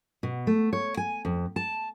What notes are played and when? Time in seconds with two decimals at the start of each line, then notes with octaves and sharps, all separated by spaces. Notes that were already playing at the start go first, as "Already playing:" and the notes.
0.23 B2
0.47 A3
0.73 C#5
0.97 G#5
1.25 F2
1.56 A5